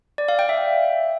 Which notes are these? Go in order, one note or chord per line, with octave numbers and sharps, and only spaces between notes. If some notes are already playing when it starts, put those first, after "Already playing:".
D5
F5
G5
E5